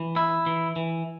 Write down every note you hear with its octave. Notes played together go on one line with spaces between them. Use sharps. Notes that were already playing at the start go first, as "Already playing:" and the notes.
Already playing: E3
E4
E3
E3